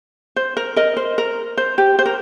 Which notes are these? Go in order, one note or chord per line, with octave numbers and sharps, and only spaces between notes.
C5
A#4
A#4 D#5
C5
A#4
C5
G4
C5
A#4